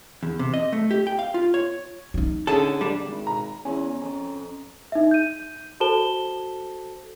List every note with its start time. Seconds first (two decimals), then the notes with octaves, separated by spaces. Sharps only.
0.23 E2
0.39 C3
0.54 D#5
0.73 A3
0.91 G4
1.07 G5
1.19 F5
1.34 F4
1.54 C#5
2.14 D#4 F4
2.47 D3 C#4 G#4 A4 A5
2.81 G3 D4
3.05 G#1
3.27 A#5
3.65 E2 C#4 G#5
4.02 F2 C#4
4.92 D#4 E5
5.11 G6 D#7
5.80 F#4 A4 C5 A5 E7 G7